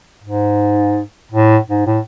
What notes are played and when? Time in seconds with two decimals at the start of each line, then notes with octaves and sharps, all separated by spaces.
0.24 G#2
1.32 A2
1.70 G#2
1.87 A2